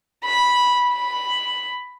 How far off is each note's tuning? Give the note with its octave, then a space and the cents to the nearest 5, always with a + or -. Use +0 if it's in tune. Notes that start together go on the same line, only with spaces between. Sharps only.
B5 -10
B5 +0